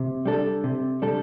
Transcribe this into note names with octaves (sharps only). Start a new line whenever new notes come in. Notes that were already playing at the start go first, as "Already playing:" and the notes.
Already playing: C3
G3 D4 A4
C3
G3 D4 A4